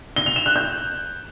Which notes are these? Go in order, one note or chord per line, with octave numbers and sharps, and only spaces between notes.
G7
F7
E7
F#6
G6